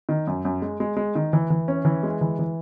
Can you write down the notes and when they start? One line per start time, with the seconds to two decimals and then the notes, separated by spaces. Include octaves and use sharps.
0.09 D#3
0.27 F#2
0.45 F#2
0.62 G#3
0.80 G#3
0.97 G#3
1.15 D#3
1.33 E3
1.50 E3
1.68 C#4
1.85 E3
2.03 G#3
2.21 E3
2.39 E3